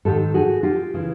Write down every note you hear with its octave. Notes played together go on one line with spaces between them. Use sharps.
G#2 D#3 G4 A4
F#4 G#4
F4 G4
C#3 E3